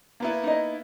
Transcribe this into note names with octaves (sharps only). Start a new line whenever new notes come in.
A#3 B3 E4
D#4 D#5